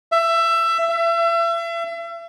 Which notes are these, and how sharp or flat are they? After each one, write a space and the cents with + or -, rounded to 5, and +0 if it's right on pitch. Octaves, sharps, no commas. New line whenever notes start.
E5 +20
E5 +35